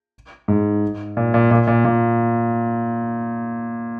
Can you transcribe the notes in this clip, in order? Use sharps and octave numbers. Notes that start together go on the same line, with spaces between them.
G#2
A#2
A#2
A#2
A#2
A#2